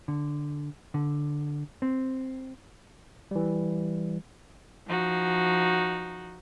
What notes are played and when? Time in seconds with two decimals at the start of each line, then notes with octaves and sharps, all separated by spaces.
0.08 D3
0.94 D3
1.82 C4
3.31 E3 G3
4.88 F3 D#4 F#4